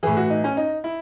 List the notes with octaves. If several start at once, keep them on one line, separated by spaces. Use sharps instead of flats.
A2 E3 G#4
F#4
D#4
C#4
D#4
E4